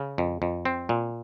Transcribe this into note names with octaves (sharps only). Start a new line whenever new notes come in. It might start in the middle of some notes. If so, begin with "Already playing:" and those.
Already playing: C#3
F2
F2
C4
A#2